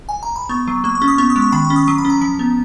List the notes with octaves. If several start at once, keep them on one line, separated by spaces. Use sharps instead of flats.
G#5
A#5
B5
B3 C#6
F#3
A#3 C#6
C#6
C#4
D#6
B3 C#6
D#6
G#3
C#6
D#3 B5
C#6
C#4
D#6
F#3 D#6
B5
C#4
A#5
F3 A#5
B3